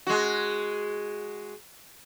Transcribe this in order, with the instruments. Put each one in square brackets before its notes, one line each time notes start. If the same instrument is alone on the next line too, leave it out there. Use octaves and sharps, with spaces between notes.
[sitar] G#3 F#4